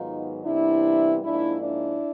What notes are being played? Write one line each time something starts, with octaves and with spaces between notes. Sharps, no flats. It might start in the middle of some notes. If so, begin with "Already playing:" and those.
Already playing: G#2 D#3 F#3 B3 D#4 F4
C3 E3 G3 B3 D4 E4
G#2 F3 A#3 D4 E4
D4 E4